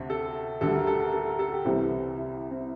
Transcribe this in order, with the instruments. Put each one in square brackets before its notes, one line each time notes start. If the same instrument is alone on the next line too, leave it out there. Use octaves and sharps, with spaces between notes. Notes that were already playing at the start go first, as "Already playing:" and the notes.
Already playing: [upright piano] D2 C3
A4
D2 D3 G3 A4
A#4
A4
A#4
A4
A#4
A4
G4
C2 C3 E3 G3 C4
E4
C4